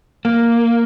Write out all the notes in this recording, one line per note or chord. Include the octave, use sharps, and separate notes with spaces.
A#3